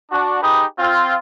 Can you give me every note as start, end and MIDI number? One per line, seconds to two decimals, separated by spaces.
0.11 0.39 62
0.11 0.39 66
0.42 0.64 63
0.42 0.64 67
0.42 0.64 68
0.42 0.64 71
0.42 0.64 87
0.79 1.15 60
0.79 1.15 65